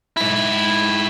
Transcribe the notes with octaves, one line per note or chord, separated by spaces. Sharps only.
G#2 E4